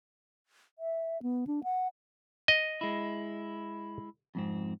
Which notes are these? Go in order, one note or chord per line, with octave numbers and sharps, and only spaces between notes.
E5
B3
D4
F#5
D#5
G#3 E4
F2 G#2 C4